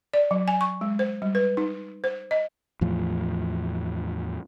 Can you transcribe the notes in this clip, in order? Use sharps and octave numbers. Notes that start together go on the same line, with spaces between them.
D5
F#3
G#5
C#6
G#3
C5
G3
B4
D#4
C5
D#5
E2 A2 F3